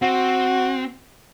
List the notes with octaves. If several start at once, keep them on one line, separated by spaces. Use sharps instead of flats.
C4 F#4